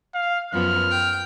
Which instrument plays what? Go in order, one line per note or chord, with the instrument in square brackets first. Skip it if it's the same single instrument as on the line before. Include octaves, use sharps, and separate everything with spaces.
[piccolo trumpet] F5
[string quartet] F#2 F3 B3 [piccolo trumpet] F6
[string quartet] G5